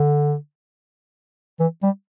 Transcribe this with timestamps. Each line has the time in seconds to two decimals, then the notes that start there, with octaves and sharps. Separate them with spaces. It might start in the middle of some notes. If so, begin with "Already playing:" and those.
Already playing: D3
1.60 E3
1.83 G3